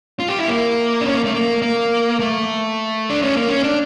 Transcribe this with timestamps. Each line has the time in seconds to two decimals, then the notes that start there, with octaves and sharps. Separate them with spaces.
0.19 F4
0.29 G4
0.39 E4
0.48 A#3
1.01 D4
1.06 C#4
1.14 A#3
1.24 A3
1.34 A#3
1.62 A#3
2.19 A3
3.10 D4
3.22 C#4
3.35 A#3
3.49 C#4
3.63 D4